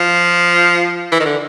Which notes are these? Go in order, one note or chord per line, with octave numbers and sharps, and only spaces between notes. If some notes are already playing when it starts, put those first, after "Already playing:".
Already playing: F3
E3
D#3
D3